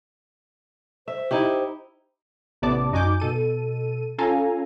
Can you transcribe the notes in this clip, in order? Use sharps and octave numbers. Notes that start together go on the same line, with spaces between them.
C5 E5
D#4 E4 G4
A1 C3 B3 D5 A5 D6
F#2 D#4 F#4 G#5 D6 G6
B2 A4 D#7
C#4 F4 A4 F5 G#5 A#5